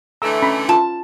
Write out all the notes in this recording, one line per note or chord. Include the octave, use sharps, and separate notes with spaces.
D3 E3 A3 A#5 E6
C#4 A#5 B5
F4 A5